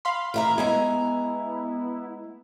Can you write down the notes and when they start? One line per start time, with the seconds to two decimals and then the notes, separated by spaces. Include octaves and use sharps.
0.05 F5 B5 C6
0.34 E3 E5 A#5
0.58 G#3 B3 E4 G#5 A#5